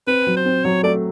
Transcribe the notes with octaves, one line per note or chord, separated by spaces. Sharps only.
C4 B4
F#3
C5
C4
F#3 C#5
A3 D5